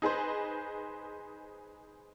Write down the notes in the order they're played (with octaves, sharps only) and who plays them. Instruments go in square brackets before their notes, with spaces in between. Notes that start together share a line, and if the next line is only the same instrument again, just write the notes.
[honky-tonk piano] D#4 G#4 B4 C5